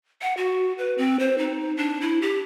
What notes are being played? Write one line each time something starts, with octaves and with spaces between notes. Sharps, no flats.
F#5
F#4
B4
C4
C5
D#4
D4
E4
G4